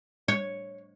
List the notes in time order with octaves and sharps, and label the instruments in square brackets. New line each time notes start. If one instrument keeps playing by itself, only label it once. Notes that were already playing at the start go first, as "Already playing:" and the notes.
[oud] C#5